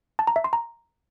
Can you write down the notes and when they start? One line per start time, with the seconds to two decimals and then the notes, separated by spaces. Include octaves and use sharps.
0.19 A5
0.27 A#5
0.36 E5
0.44 C6
0.53 A#5